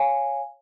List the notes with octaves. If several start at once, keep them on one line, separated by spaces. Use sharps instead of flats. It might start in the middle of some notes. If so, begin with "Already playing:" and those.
Already playing: C#5 F5 G#5